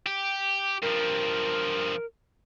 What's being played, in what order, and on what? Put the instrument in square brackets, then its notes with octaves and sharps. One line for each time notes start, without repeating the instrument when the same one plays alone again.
[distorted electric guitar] G4
[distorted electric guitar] G2 F3 [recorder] A#4